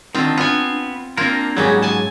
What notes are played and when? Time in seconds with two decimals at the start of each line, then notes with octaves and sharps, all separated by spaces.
0.15 D3 D#3 C4 D4 F4
0.37 B3 F4 G#5
1.17 A#3 C4 D4 F4 A#4
1.57 G#2 F#3 G3 A#3 C#4 G#4
1.82 G#5 A5